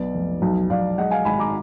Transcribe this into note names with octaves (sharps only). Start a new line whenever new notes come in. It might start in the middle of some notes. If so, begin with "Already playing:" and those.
Already playing: B1 B3 D5
F1
B1
B1 D5 F5
G#3 D#5 F#5
F5 G#5
G#1 G#5 B5
A#5 D6